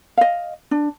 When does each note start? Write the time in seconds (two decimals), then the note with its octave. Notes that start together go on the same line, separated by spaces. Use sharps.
0.17 D#5 F5
0.71 D4